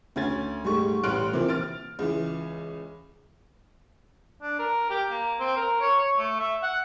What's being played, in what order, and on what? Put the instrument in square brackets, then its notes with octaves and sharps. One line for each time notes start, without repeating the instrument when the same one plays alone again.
[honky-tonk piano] D2 C#4 G#6 A6
G#2 G3 A3 C#6
A1 G3 C6 F6 F#6 D7
C3 E3 F3 A#3
F6 A6 D7
C#2 E3
[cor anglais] D4
A#4
G4
A#3
C4
A#4
C#5
C#5
A3
E5
F#5